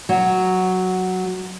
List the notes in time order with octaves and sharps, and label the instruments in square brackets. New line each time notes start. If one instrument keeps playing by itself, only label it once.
[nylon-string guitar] F#3